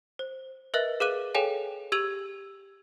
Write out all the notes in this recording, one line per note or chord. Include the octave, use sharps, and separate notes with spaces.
C5
A#4 B4 D#5 E5 F#6 A6
G#4 B4 F5 D6 F#6 D#7
G#4 A4 C#5 F5 G5 G#5
G4 E6 G#6 D#7 F7 F#7